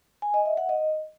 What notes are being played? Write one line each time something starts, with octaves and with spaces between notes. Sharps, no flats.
G#5
D#5
E5
F#5
D#5